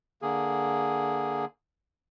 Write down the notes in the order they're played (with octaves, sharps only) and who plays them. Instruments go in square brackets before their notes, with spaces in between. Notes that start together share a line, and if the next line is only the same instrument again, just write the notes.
[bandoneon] D3 A#3 G#4